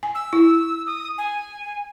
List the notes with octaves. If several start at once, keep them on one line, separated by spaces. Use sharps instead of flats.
G#5
E6
E4
D#6
G#5